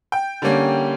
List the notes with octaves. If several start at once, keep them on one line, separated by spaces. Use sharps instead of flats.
G5
D3 G3 A#3 C#4